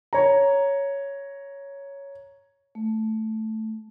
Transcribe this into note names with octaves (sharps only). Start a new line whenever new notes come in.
C#5 A#5
A3